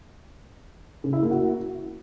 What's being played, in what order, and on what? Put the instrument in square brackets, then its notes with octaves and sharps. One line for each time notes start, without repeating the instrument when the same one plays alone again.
[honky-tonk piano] C#3
E4
A#3
F#4